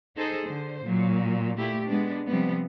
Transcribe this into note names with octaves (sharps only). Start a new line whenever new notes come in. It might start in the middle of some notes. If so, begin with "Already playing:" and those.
D#4 G#4 A4 C5
D3 C5
A#2 F#3
A#2 A3 E4 G4
G#3 B3 D4
C3 F3 G3 B3